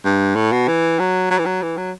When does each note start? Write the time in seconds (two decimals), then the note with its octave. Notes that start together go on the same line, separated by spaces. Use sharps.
0.05 G2
0.36 A2
0.52 B2
0.68 E3
0.99 F#3
1.31 F#3
1.38 E3
1.46 F#3
1.63 E3
1.78 F#3